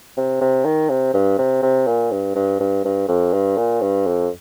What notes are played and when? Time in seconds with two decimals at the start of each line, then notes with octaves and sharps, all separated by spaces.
0.17 C3
0.41 C3
0.65 D#3
0.89 C3
1.14 G2
1.38 C3
1.63 C3
1.87 A#2
2.11 G2
2.35 G2
2.60 G2
2.85 G2
3.08 F2
3.33 G2
3.57 A#2
3.82 G2
4.07 F2